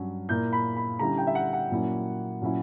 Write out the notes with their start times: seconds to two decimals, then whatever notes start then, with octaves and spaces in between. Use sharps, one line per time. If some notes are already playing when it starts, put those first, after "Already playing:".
Already playing: G2 F#3 C#4
0.29 A#2 A#3 E4 G6
0.53 B5
0.76 B5
0.99 D3 G3 C#4 E4 A#5
1.17 G5
1.27 E5
1.35 F#5
1.53 F#5
1.71 A#2 F#3 A#3 C#4 E4
2.41 A#2 F#3 C#4 E4